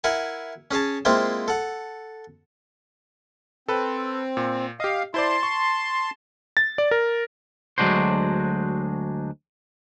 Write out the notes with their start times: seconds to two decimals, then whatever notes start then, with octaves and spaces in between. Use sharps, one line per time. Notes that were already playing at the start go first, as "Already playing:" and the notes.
0.04 E4 A#4 F#5 G#5
0.71 C#4 G#4 C#5 A5
1.05 G#3 A#3 C4 E4 F4 C5
1.48 A4 F#5
3.68 C4 A4 B4
4.37 A#2
4.80 G4 D#5 F5
5.14 E4 C5 D5 A5 C6
5.43 C#6
6.57 A6
6.78 D5
6.91 A#4
7.78 D2 F#3 G#3 D4 F#4 C5